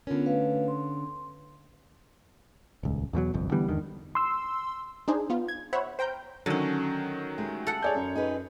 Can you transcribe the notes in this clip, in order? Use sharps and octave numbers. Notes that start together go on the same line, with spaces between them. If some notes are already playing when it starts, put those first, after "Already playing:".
D3 B3 C#4 F4 A#4
A3 B4 F5
C6
D#1 C#2
E2 B2 F3 F#3
G1 C2 F2
D3 E3 G3 B3
E2 G#2 D3 D#3
C6 E6
D4 D#4 G#4 C5
B3 F4
G#6
C5 C#5 E5 F#5 B5
C5 G5 A#5 F6 G6
D3 D#3 F#3 C#4
G#3 A3 G4
A4 F#5
G#4 C#5 D5 G#5 G6
F#2
D#4 G#4 B4